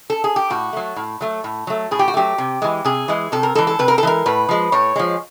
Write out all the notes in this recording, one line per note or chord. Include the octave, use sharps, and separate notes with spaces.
A4
G#4
G4
A2 F#4
F#3 A3
A2
F#3 A3
A2
F#3 A3
A2 G#4
G4
F#4
F#3 A3 G4
C3
E3 G#3
C3 G#4
E3 G#3
C3 A4
A#4
E3 G#3 A4
A4
C3 B4
A#4
A4
E3 G#3 A#4
A2 B4
F3 G#3
A2 C#5
F3 G#3